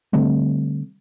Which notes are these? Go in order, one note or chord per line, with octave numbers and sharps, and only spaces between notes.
D3 G3 A3 C4